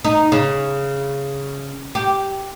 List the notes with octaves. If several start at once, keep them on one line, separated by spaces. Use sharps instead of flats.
D#4
C#3
G4